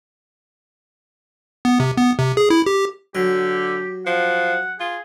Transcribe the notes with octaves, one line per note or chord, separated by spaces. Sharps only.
B3
C3
B3
C3
G#4
E4
G4
D3 F#3 G4
F3 F#5
F4 G#4